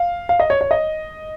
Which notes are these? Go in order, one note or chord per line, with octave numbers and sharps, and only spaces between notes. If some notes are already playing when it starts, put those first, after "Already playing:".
Already playing: F5
F5
D#5
C#5
C#5
D#5